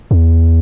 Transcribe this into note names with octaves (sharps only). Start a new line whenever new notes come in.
E2